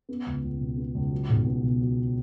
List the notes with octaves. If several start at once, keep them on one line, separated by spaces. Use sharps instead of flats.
B3
C#2
C#2
B2
B3
C#2
F#3
B1
B3
B2
F#3